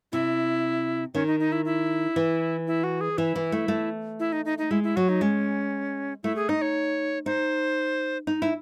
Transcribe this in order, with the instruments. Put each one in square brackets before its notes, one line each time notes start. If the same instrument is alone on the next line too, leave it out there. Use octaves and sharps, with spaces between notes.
[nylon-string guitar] C3 [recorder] E4
[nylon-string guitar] D#3 [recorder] C#4
[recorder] D#4
D#4
E4
E4
[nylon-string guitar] E3
[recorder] E4
F#4
G#4
[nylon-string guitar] E3 [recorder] E4
[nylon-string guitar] E3
A3
A3
[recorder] E4
D#4
D#4
D#4
[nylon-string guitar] G#3 [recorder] E4
[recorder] E4
[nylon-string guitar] F#3 [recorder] F#4
[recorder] D#4
[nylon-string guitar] G#3 [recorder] C#4
[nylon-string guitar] A3 [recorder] E4
[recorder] G#4
[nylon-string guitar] D#4 [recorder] D#5
[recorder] C#5
[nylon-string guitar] D#4 [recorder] C5
[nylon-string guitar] D#4
E4